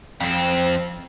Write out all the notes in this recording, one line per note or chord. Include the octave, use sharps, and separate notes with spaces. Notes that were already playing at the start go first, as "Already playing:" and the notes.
F2 C4